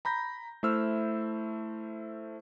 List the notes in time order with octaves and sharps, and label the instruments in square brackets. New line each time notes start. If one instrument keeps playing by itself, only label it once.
[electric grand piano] A#5 B5 G6 A#6
A3 E4 C5 E6 F6